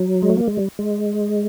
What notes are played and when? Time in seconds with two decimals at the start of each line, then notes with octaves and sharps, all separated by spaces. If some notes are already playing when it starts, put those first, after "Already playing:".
Already playing: F#3
0.22 G#3
0.30 A3
0.37 A#3
0.47 G#3
0.57 G3
0.79 G#3